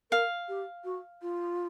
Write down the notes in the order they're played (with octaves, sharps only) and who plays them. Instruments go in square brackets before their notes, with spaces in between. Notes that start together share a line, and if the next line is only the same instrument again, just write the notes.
[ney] A#4 [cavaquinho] F5
[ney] G4
F#4
F4